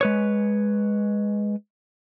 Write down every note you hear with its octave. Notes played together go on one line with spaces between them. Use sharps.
G#3 B4 C#5